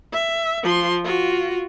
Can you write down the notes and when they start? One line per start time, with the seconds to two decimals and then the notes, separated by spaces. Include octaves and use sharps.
0.13 E5
0.63 F3 C6
1.05 F4 F#4